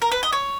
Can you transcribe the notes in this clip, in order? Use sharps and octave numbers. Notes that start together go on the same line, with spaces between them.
A#4
B4
D#5
C#5